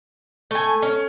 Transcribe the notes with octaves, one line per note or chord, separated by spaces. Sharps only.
A3 G#5
C#4